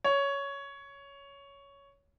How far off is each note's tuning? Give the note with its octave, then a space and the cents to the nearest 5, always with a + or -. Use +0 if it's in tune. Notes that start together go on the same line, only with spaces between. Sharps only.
C#5 +10